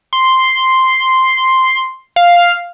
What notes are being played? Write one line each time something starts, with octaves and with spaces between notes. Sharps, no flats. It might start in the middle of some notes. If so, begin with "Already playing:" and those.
C6
F5